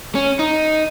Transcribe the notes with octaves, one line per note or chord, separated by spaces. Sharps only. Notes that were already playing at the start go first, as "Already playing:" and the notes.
C#4
D#4